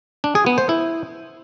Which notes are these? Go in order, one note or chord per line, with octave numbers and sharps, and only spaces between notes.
D4
G#4
B3
C5
E4